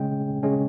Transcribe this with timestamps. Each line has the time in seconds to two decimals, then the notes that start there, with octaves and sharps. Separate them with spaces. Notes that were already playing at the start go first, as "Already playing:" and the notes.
Already playing: C#3 G#3 C#4 G5
0.43 C#3 G#3 C#4